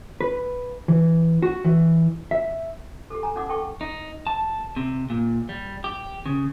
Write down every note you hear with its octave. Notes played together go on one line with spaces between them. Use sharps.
B4
E3
F#4
E3
E5
G4 A4
G#5 A#5
C#4 D#4 F#5 D6
A4 G5 C#6
D#4
A5
C3
A#2
G3
G4
C#3